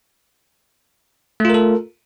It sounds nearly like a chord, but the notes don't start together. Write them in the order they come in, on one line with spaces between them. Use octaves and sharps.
A3 F4 A#4 A4